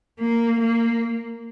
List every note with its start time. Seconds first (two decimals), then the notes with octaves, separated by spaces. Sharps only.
0.20 A#3
0.60 A#3